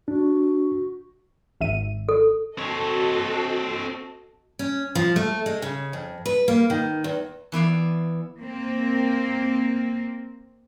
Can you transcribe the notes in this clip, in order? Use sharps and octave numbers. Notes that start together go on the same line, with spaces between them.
D4 F#4
G#1 E5 D#7
A4
C4 F#4 A4 C#5 D#5
C#4
F3
A3
G#3
C#3
F2
B4
A#3
D#3
E2
E3 B3 D5 F5
A#3 C4